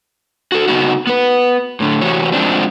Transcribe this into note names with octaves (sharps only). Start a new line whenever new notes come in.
F#4 A4
C#3 B3 D#4 F#4
B3 B4
A2 D3
C3 E3 F#4 G4 C#5
F3 G#3 A#3 C4 D4